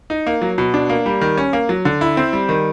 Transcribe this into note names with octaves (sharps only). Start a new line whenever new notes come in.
D#4
A#3
F#3
B2
D4
A#3
G3
D#3
C#4
A#3
F#3
D3
E4
C4
G3
D#3